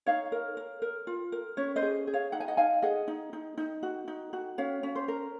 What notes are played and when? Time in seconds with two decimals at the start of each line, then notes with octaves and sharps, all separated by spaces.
0.06 D#4 C#5 F5
0.32 A#4
0.57 A#4
0.82 A#4
1.07 F4
1.32 A#4
1.57 C#4 C#5
1.76 C5 D#5
1.82 G#4
2.07 G#4
2.14 C#5 F5
2.32 D#4 F#5
2.40 G#5
2.48 D#5 F#5
2.57 D#4 F5 G#5
2.82 G#4 D#5 F#5
3.08 D#4
3.33 D#4
3.58 D#4
3.83 F#4
4.08 D#4
4.33 F#4
4.58 C#4 C#5 F5
4.83 C#4
4.95 C5
5.08 A#4